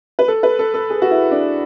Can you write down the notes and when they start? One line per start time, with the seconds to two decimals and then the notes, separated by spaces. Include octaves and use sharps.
0.19 B4
0.28 A4
0.43 B4
0.59 A4
0.74 A4
0.90 G#4
1.02 F#4
1.11 E4
1.31 D4